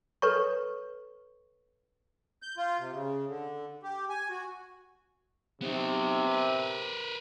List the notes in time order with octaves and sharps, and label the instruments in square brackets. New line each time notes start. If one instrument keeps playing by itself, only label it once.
[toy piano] A4 B4 C#5 C#6
[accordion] G6
F4
C3
C#3
D3
G4
G#5
F#4
[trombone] C3 [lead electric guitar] B3 D#4
[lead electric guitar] A#4 B4